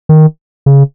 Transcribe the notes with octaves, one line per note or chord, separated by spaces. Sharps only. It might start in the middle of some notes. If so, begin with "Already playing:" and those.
D#3
C#3